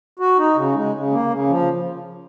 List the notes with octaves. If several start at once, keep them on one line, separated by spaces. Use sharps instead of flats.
F#4
D#4
C#3
G#3
C#3
A#3
C#3
F3